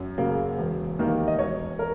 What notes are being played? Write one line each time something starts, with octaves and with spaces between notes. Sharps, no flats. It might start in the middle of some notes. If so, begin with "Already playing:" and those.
Already playing: F#2
C#3 F#3 A#3
E1
D#2 D#3 A#3
D#5
E1 C#5
A#4